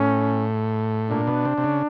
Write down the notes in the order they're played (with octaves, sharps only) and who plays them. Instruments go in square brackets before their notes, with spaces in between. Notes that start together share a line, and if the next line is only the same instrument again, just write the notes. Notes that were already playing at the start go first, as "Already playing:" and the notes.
Already playing: [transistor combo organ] A2 [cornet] C#4
[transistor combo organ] A#2 [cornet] D4
[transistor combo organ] B2
C3
C3
C#3